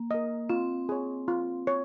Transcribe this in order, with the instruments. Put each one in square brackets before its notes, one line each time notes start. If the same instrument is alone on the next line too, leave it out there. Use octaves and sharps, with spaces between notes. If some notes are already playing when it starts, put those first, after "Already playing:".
Already playing: [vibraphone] A#3
[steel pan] A#4 D#5
[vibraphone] C4 [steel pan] F4
[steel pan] G#4 C#5
F4
C#5